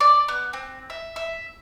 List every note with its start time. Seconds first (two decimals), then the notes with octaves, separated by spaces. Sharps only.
0.01 D5
0.28 B3
0.53 C4
0.90 E5
1.16 E5